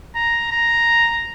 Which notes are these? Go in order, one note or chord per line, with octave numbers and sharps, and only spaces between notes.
A#5
A#5